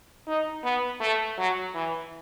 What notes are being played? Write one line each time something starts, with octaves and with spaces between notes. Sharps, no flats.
D#4
B3
A3
F#3
E3